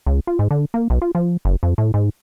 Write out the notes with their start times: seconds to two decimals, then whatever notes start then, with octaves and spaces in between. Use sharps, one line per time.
0.06 C#2
0.27 F4
0.39 G#2
0.51 D3
0.74 A#3
0.90 B1
1.02 F4
1.15 F3
1.45 F#1
1.63 F2
1.78 A2
1.94 G#2